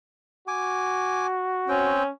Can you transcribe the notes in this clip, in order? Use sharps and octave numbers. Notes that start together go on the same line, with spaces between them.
F#4 G#5 D6
C4 C#4 G5